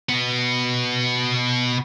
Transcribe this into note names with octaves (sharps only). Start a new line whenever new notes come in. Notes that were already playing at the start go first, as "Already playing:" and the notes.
B2 B3